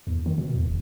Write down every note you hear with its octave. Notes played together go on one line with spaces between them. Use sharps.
E2
D#3
B2
E2
D#1